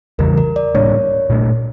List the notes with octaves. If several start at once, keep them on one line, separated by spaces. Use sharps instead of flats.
E2 C#3 E3 G3 A#4
A#4
D5
A2 G3 A#3 D4 C#5
A#2 A3 D4